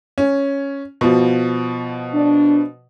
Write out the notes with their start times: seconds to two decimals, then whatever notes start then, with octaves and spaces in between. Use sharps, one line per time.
0.18 C#4
1.01 B2 F3
2.13 D4